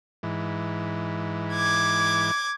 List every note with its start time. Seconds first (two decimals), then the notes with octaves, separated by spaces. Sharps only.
0.23 G#2 E3
1.53 D6 G#6